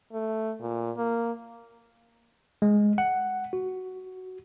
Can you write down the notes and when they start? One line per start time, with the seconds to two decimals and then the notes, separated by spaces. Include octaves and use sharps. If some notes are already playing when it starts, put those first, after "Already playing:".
0.13 A3
0.61 A#2
0.97 A#3
2.62 G#3
2.98 F#5
3.53 F#4